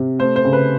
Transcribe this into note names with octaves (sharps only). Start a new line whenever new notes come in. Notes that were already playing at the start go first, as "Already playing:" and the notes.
Already playing: C3
A3 C5
C5
C#3
B4